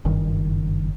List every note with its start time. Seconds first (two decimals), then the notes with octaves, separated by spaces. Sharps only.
0.05 F#1 G2 D#3